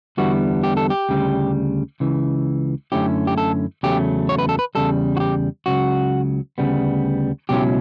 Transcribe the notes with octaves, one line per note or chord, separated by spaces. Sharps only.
E2 D3 G3 B3 E4 F#4
G4
A4
G4
D2 C#3 G3
C#2 C#3 E3
F#2 D3 A3 C#4 E4 G4
G4
A4
E2 C#3 F#3 A3 C#4 G4
C#5
B4
A4
B4
E2 C#3 G3 A4
F#4
G4
C#2 C#3 F#3 F#4
D2 C#3 G3 B3
C#2 B2 F#3 C#4 E4 G4